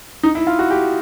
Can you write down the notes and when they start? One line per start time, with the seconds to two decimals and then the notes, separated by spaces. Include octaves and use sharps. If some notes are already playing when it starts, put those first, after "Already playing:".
0.23 D#4
0.35 E4
0.47 F4
0.59 F#4
0.71 G4